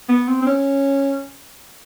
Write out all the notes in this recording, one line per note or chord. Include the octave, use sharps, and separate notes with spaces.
B3
C4
C4
C#4